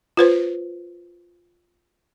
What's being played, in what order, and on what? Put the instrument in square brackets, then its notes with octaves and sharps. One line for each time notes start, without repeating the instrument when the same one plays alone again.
[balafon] F4 B4 C5